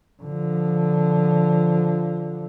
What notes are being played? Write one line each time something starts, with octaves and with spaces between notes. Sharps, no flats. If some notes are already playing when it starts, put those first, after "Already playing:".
D3 F3